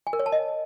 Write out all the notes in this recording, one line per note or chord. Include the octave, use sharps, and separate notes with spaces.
G#5
A#4
C#5
A5
D#5